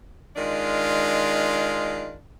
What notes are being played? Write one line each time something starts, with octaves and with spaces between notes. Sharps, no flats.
D#3 G#3 D4 F4